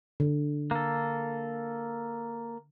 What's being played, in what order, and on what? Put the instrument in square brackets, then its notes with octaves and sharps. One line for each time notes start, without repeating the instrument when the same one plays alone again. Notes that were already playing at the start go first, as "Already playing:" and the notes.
[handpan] D3
[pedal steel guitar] A#3 A4